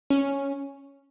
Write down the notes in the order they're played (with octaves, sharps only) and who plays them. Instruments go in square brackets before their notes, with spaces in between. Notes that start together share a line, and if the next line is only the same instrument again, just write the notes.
[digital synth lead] C#4